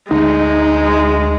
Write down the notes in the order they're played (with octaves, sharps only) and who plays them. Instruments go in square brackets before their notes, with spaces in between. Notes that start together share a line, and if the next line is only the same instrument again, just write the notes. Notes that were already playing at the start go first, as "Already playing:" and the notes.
[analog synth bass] D2 [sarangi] G#3 [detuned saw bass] D#4